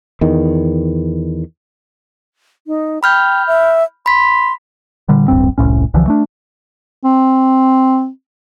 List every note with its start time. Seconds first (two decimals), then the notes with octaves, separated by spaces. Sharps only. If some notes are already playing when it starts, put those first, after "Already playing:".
0.21 E2 D#3
2.67 D#4
3.03 G5 B5 F6 G6
3.47 E5
4.06 B5 C6 B6
5.08 A#2 D3 G3
5.28 D1 A1 G2 C4
5.58 E1 C2 A2 C#4
5.94 C2 D3 E3 F3
6.07 A3 D4
7.04 C4